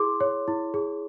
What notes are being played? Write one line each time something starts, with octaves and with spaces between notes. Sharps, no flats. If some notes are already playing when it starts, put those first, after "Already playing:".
Already playing: E4 G#4 C6 D6
C#5
E4
G#4